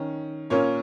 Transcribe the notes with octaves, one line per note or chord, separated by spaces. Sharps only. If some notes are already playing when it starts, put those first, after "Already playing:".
Already playing: D#3 C#4
A#2 A#3 C#4 C#5